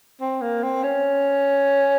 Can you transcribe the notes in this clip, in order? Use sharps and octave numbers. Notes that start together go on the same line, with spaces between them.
C4
A#3
C4
C#4